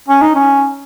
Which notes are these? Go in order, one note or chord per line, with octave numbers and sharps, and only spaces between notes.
C#4
D#4
C#4